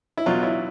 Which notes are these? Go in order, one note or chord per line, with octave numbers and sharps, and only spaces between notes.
E4
E2 B2 F#3 F4
E4